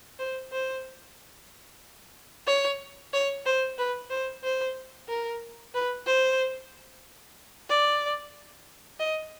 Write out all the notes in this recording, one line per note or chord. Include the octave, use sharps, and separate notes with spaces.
C5
C5
C#5
C#5
C5
B4
C5
C5
A#4
B4
C5
D5
D#5